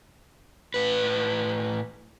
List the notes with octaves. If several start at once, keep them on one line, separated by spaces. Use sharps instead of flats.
A2 B4